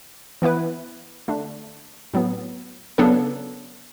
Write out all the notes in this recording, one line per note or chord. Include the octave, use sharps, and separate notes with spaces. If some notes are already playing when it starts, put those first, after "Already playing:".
E3 B3 E4 B4
D3 A3 D4
A2 F#3 B3
C#3 F#3 B3 D4 A4